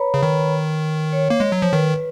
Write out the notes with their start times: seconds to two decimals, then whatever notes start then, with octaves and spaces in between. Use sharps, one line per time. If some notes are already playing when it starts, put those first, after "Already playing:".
Already playing: B4 C#5 A#5 B5
0.14 C#3
0.23 D#3
1.13 C#5
1.30 A#3
1.40 G#3
1.52 F#3
1.62 F3
1.73 D#3 B4